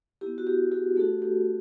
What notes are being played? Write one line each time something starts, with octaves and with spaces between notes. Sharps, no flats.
B3 E4 G4
F#4
G4
F#4 G#4
A3 D4 F#4 G4 A4
G4